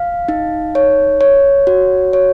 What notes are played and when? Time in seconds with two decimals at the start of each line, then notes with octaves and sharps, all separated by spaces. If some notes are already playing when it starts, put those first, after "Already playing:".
Already playing: F5
0.28 D#4
0.75 C#5
1.21 C#5
1.67 F#4
2.13 C#5